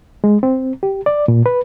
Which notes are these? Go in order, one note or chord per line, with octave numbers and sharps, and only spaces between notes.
G#3
C4
G4
D5
A#2
B4